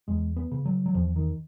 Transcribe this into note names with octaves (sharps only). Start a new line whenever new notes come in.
E2 G#3
B3
C#3
F#3
F#3
E2 F3
D#3